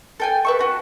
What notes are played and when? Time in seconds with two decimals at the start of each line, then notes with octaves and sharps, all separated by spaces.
0.20 A4 G5 G#5
0.45 B4 E5 C#6
0.59 F#4 A4 B4